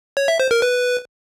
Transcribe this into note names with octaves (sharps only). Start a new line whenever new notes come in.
C#5
E5
C5
A#4
B4